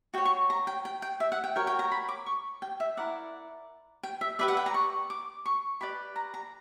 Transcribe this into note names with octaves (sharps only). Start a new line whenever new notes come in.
F#4 C#5 G5
C#6
A#5
G5
G5
G5
E5
F#5
G5
F#4 A#4 C#5 G5
G5
A#5
B5
D6
C#6
G5
E5
E4 A#4 D5 F#5
G5
E5
G4 B4 D5 E5
F#5
G5
A#5
C#6
D6
C#6
G4 B4 D5 B5
A#5
A#5